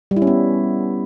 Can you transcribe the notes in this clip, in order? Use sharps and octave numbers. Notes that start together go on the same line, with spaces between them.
G3
E4
C#4
B3